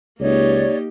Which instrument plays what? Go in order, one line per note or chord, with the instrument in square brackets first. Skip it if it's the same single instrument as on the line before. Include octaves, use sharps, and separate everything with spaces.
[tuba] C#2 [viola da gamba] A#3 D#4 G4 [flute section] C#5 D5